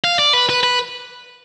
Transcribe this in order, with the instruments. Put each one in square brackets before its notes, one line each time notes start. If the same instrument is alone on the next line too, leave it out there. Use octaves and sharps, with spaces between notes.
[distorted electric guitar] F5
D5
B4
B4
B4